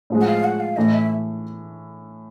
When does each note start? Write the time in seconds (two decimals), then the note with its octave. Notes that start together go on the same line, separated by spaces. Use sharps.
0.10 A2 F3 G#3
0.21 F#5
0.27 F5
0.44 F#5
0.60 F5
0.77 A2 E3 A3 D#5
0.93 E5